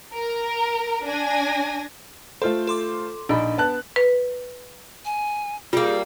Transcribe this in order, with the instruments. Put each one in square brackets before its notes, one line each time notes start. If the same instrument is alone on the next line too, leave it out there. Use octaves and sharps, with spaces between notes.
[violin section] A#4
D4 G#5 A#6
[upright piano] A3 F4 C5 [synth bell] A4
[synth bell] A4 C6 D6
[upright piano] A#1 D#4 B5 [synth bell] D4
[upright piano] B3 A5 F#6
[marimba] B4
[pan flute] G#5
[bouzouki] G3 A#3 [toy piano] F4 [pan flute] G#4